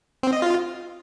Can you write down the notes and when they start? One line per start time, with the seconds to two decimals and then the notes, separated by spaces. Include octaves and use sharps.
0.23 C4
0.33 D#5
0.42 F4